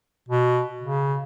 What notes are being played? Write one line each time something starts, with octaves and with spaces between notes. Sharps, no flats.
B2
C#3